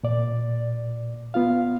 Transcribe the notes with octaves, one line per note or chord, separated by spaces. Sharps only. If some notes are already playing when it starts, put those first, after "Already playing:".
A#2 D5
B3 F4 F5